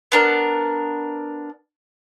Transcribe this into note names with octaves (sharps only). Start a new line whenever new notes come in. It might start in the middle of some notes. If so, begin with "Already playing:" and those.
B3 D4 A#4